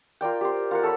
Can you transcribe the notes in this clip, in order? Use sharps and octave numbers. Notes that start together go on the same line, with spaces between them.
F4 A#4 D5 G5
G4 C5
F4 A#4 F#5
A4 C#5 B5